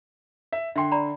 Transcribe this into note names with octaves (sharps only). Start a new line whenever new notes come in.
E5
D3 E5 G5 C6
D5 A#5 B5